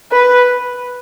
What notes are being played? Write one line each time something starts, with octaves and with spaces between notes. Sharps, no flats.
B4